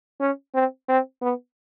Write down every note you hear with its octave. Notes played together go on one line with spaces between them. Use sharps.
C#4
C4
C4
B3